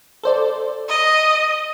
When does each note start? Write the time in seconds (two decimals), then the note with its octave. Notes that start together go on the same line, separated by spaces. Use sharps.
0.23 A4 C5 D5
0.88 D#5